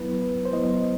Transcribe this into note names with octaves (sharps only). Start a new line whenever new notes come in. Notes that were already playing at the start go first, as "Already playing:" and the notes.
Already playing: F#3 B3 E4 B4
C5
F#3 B3 E4 D#5